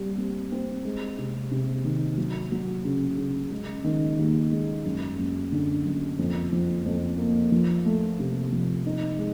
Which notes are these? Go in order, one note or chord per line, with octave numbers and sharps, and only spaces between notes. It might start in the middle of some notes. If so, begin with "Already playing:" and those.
Already playing: G3 C4
C4
C4
G#3
C3
C3
D#3
F#3
F#3
C#3
C#3
G#3
D#3
D#2
G#3
F#2
F#2
D3
F#2
F2
F3
F2
A#3
F3
A3
C3
F3
D#4
G#3